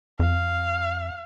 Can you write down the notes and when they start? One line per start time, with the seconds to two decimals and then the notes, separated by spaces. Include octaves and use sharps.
0.20 F2 F5